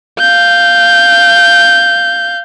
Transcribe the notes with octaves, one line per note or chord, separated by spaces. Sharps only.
F5 G6